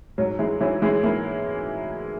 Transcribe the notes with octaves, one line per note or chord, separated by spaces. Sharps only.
G#2 F#3
E3 G#3
E3 F#3
E3 G#3
E3 A#3